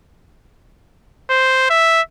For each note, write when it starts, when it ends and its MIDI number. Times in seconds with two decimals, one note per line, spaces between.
1.30 1.65 72
1.70 2.02 76